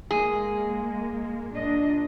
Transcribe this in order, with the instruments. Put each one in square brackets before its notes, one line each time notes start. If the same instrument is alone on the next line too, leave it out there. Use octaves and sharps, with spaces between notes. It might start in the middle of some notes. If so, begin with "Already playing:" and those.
[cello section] G#3 A#3 [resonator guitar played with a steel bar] G#4
[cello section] A#2 D4 D#5